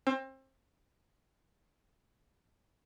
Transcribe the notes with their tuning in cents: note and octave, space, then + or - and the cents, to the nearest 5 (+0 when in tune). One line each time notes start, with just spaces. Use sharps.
C4 +30